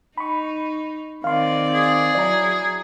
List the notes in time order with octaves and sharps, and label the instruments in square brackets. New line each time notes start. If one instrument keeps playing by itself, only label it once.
[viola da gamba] D#4 [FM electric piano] B5 C#6
[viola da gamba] D#3 C4 D5 [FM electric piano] F5 C6
[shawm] G#4
[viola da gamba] F#3 E4 [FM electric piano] D5 A#5